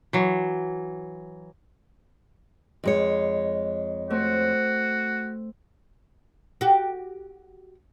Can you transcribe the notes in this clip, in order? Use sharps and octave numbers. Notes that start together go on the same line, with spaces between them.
E3 F#3
F2 G#3 C#5
A3 C4 F#4
F#4 G4